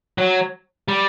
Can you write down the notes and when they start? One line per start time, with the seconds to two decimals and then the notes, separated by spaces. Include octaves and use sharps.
0.18 F#3
0.88 G3